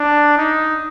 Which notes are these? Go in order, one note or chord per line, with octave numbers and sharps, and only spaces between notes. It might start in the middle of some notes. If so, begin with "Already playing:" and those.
Already playing: D4
D#4